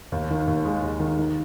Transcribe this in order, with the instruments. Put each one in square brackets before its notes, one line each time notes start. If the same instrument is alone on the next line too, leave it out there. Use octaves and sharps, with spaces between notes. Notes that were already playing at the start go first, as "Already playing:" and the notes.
[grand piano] D#2
D#3
D#2
G#3
D#2
D#3
D#3